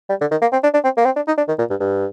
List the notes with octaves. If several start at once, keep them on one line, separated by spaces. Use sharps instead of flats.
G3
D3
D#3
A#3
C4
D4
D4
C4
A#3
C4
D4
D#4
D4
D#3
A#2
G2
G2